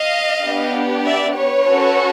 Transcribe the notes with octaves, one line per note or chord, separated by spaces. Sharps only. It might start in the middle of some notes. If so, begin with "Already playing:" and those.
Already playing: D#5 F5
B3 D4 G4
D5 E5
B4 C#5
C#4 F#4 A4